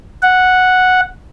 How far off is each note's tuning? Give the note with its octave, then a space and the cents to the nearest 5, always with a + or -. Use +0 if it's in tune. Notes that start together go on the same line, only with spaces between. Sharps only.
F#5 -5